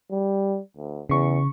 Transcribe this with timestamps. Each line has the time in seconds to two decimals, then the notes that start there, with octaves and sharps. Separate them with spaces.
0.11 G3
0.77 D2
1.09 E2 C#3 C#6